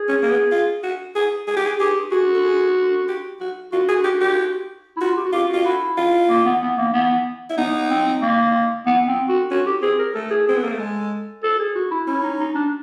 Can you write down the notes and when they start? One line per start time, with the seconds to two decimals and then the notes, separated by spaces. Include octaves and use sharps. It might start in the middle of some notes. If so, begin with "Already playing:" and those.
Already playing: G#4
0.08 C#4
0.23 A#3
0.30 B3
0.52 F4
0.83 F#4
1.15 G#4
1.47 G#4
1.56 G4
1.65 G#4
1.80 G4 G#4
2.11 F#4 G#4
2.35 A4
2.44 G#4
3.08 G4
3.40 F#4
3.72 F4 F#4
3.88 G#4
4.04 G4
4.21 G4
4.96 E4
5.01 F4 F#4
5.17 G4
5.25 F#4
5.33 F4 G4
5.49 F4 F#4
5.65 E4 F#4
5.97 F4
6.29 A#3
6.45 B3
6.61 B3
6.77 A#3
6.93 B3
7.50 E4
7.57 B3 D#4
7.90 C4
8.22 A#3
8.86 B3
9.07 C4
9.29 F#4
9.50 C#4 F#4
9.66 G4
9.82 C4 G#4
9.99 A#4
10.14 A3 A4
10.31 G#4
10.47 C4 G#4
10.56 B3
10.62 A#3 A4
10.71 A3
10.79 G#3
11.43 A4
11.59 G#4
11.75 F#4
11.91 E4
12.07 C#4 E4
12.23 D#4
12.39 D#4
12.55 D4